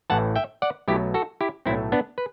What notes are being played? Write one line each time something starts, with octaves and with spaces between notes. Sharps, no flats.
A1 A2 E3 F#5 A5
E5 G5
D5 F#5
B1 B2 F#3 A3 E4 G4
F#4 A4
E4 G4
B1 A2 F#3 A3 C4 E4
B3 D4
B4